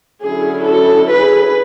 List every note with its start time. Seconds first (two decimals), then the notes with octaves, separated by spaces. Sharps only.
0.23 D3 F#3 C#4 E4 G#4
0.67 F#4 A4
1.12 G#4 B4